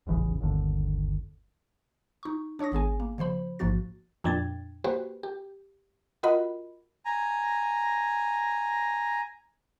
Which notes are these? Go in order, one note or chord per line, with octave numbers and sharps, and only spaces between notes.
D#1 A1 E2 C#3
G1 D#2 D3
D#4 C#6
D4 C#5 C#6 D#6 A#6
G#1 B3 G#4 G#5
A#3
C#3 F3 C5 B5
A1 G#2 F3 A#3 F#4 A6
F2 A#2 D4 G5 G#6 A6
A#3 F#4 G4 B4 C5
G4
F4 F#4 A#4 D#5 F#5 B5
G#5 A#5